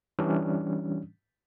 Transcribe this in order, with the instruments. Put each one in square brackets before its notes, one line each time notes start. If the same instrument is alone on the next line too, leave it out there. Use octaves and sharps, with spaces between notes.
[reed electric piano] E3 G3 C#4 D4